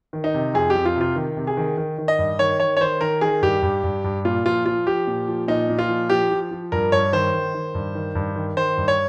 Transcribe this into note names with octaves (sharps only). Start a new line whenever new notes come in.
D#3
D#4
C3
F2 G#4
G4
F2
F4
C3 F4
D#3
C3
G#4
D#3
D#3
D#3
D#5
G2
D#3 C#5
D#3 C#5
C#5
D#3 C5
D#3 A#4
D#3 G#4
G2 G4
G2
G2
G2
A#2 F4
F3 F4
F3 F4
F3 G4
A#2
F3
A#2 D#4
A#2
F4
F3
F3 G4
F3
F3
G2 A#4
G2 C#5
D#3 C5
D#3
D#3
G2
D#3
G2
D#3
D#3 C5
G2
C#5